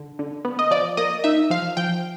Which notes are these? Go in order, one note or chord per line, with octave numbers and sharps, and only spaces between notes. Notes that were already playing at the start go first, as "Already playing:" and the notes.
Already playing: D3
D3
B3
D#5
F3 D5
A#3 D#5
D#4 E5
F3 F5
F3 G5